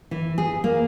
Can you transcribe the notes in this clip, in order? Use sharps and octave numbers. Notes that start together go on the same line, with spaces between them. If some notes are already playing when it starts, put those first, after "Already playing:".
E3
G#4
A#3